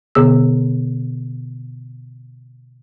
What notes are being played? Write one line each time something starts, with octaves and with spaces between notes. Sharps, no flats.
B2 D3 B3 G#4 E6